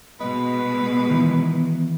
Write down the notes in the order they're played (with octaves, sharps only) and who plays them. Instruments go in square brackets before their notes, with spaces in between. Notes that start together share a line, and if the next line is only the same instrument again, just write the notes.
[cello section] B2 G#3 [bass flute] B3 [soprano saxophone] B4 [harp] D#5 F#5
[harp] D#3 E3